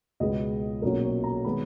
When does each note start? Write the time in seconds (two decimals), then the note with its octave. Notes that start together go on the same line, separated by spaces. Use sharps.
0.20 C#2 B2 G#3 B3 D#5
0.82 B1 A#2 F#3 C#4 A#4
1.04 C#5
1.24 A#5
1.44 D#3 G#3 B3 B5